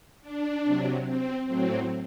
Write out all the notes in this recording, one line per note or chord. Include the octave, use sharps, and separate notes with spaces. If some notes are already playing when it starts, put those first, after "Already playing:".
D4
C3 F#3
C4
A2 F#3 C4